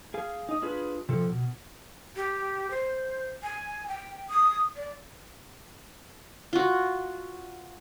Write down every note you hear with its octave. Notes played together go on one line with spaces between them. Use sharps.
G#4 F5 G#5
D#4 D#5
D4 F4 G#4 B4
C3 F3 A4
B2
G4
C5
G#5
G5
D#6
D5
F4 F#4